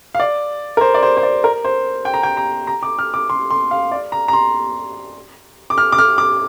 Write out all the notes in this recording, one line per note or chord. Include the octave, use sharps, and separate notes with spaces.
F5
D5
A#4
C5
D5
C5
C5
D5
A#4
C5
G5
A#5
G5
A#5
A#5
D6
F6
D6
C6
C6
F5
D5
A#5
A#5
C6
D6
F6
D6
F6
D6